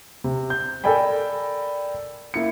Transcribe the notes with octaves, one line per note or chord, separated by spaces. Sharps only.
C3
G6
A4 A#4 D5 G5 G#5 B5
A#3 E4 C#7